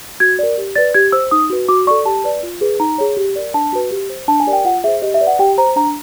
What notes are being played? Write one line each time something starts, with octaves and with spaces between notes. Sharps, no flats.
F#4 G#6
A#4 D5
G4
B4 D5 A6
G4 G#6
C5 E6
D#4 D#6
F#4 B4
F#4 D6
A4 D5 C#6
G4 A5
B4 D5
F4
G#4 B4
D#4 A#5
G#4 C#5
G4
A#4 D5
D4 A5
F#4 B4
G4
C5
D4 A5
G#5
G4 A#4 D5
G5
F4 F#5
G#4 C5 E5
G4 D#5
E5
B4 D5
F#5
G4 G5
C5 A#5
D4 A#5